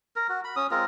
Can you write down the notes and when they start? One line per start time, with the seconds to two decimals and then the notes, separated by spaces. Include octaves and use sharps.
0.16 A#4
0.29 F#4
0.44 B5
0.56 C#4 D#6
0.71 G#3 C4 F4 A#4